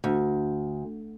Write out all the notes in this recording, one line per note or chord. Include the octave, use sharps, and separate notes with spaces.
D2